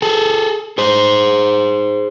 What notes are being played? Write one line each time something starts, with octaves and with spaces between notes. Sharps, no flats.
G#4 A4
G#4 C5